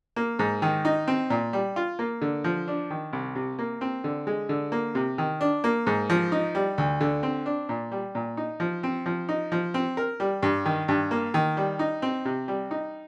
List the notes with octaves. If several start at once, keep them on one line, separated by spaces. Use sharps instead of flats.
A#3
G#2
D#3
D#4
C4
A#2
G3
F4
A#3
D3
F3
D4
D#3
C2
C3
A#3
C4
D3
G#3
D3
A#3
C3
D#3
D4
A#3
G#2
F3
D#4
G3
D2
D3
C4
D4
A#2
G3
A#2
D#4
F3
C4
F3
D#4
F3
C4
A#4
G3
G2
D#3
G2
A#3
D#3
G3
D#4
C4
C3
G3
D#4